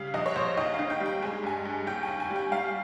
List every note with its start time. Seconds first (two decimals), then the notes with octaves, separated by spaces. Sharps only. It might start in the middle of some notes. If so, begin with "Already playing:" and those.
Already playing: C#3 G3 F5
0.14 A#1 D#5
0.26 C#5
0.36 A#1 C5
0.57 D#2 D#5
0.74 F5
0.79 D#3
0.90 G5
1.00 G3
1.06 G5
1.22 G#3 G#5
1.44 G2 G#5
1.65 G2
1.87 D#2 G5
2.03 D#2 G#5
2.20 G#5
2.30 G3
2.36 G5
2.52 G3 F5